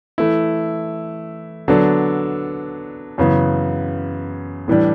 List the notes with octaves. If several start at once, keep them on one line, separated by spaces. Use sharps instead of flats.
E3 A3 E4
D3 F#3 B3 D4 A4
F#2 C#3 E3 B3
A2 E3 G3 D4